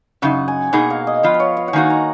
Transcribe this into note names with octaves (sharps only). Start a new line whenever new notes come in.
F#2 C#3 D#4 F#5
G#5
B2 A#3 D#4 G#4 F#5
F5
D#5
F3 B3 F4 F5
B4
C#5
F5
F#5
D#3 A#3 D#4 F#4 G#5
A#5